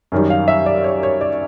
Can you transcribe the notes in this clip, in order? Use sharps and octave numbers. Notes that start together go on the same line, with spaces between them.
F#2 D#3 G3
F5
E5
D5
C#5
C#5
D5